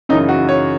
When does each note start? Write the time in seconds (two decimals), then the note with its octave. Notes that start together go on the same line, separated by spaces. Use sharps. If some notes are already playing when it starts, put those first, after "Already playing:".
0.09 F#2 C#3 E3 D#4
0.29 F#4
0.49 C#5